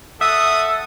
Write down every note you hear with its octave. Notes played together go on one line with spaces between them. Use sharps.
A4 E5 F#5 D#6